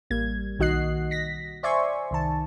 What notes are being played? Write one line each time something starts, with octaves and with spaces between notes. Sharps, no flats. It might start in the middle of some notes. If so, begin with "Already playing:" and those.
A1 G3 A#3 G#6
B1 D#3 F#4 D#5 F#6 C7
A#6 B6
C5 D5 E5 G#5 C6 C#6
C2 D#3 A5